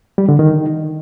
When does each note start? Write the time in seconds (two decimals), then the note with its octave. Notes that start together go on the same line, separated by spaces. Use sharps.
0.18 G3
0.29 D3
0.39 D#3